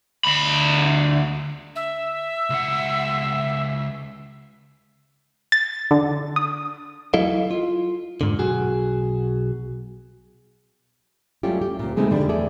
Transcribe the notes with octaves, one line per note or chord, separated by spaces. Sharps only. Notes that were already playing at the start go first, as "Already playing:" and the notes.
D2 B5
E5
C#2 F#5
A6
D3
D#6
F#3 E4 A4 D#5 F5
F4
G#2 D3
B1 F#4 G#4
F#3 G3 A3 C#4 F4 G4
G4
D2 A#2
C#3 G#3 A3 C4 C#4 D#4
F2 D3 G3 D4
E2 A3 G#4 A4 D5